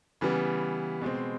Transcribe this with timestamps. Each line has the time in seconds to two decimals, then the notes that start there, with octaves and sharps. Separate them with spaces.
0.21 C#3 E3 G3 B3
1.01 B2 G#3 C4